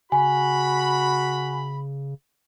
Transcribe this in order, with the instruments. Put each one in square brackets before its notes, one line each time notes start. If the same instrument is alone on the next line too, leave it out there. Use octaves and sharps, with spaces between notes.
[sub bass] C#3 [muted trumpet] F#4 [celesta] G#5 [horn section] B5